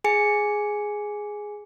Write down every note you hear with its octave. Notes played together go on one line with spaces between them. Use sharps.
G#4 G#5 C#7